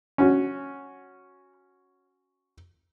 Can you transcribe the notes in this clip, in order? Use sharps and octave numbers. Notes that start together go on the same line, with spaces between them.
C#4 F#4